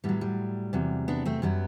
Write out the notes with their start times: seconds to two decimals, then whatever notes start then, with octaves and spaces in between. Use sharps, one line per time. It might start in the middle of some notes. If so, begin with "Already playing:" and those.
0.04 A2 F#3 G3 B3
0.21 G3
0.73 E2 C3 F#3
1.08 B3 D4
1.25 A3 C4
1.42 F#2 F#3 G3 B3